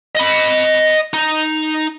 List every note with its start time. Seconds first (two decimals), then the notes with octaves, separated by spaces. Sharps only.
0.17 D#5 B5
1.13 D#4